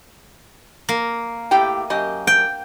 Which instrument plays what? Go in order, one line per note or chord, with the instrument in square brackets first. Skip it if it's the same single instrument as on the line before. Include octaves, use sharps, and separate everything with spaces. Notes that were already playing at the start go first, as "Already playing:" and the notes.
[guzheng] A#3
[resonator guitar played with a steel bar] A2 G4 G5
F#2 G4 D#5
[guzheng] G5